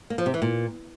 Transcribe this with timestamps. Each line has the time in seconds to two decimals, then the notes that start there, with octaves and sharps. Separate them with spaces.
0.10 A#3
0.18 F3
0.26 C3
0.34 E3
0.42 A#2